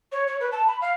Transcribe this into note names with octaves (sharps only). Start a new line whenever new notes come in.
C#5
C#5
B4
A5
B5
F5